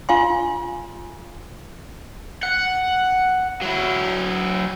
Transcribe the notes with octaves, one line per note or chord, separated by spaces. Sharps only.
F4 F5 G#5 C6
F#5
F#3 E4